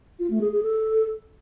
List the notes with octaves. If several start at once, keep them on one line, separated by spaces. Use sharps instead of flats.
F4
A3
G#4
G#4
A4